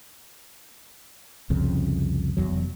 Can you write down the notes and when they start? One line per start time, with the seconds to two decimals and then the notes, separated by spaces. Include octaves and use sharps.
1.50 C2 F2 C#3
2.37 F1 E2 F#3